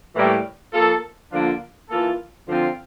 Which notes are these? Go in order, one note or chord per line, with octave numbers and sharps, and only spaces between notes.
A2 E3 G3 A#3
F3 A#3 F4 A4
D3 F3 A#3 D4 F4
E3 A#3 F4 A4
D3 F3 C4 F4